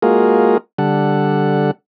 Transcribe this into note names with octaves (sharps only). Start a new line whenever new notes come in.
G#3 A#3 F4 F#4 G#4 A#4
D3 G3 A4 F#5